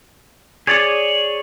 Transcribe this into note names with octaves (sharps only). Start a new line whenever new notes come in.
G#4 C#5 D5 G#6 A6 C#7